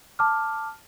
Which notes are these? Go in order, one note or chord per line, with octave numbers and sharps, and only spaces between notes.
A5 D6 F6